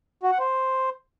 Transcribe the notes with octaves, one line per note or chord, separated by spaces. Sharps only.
F#4
F#5
C5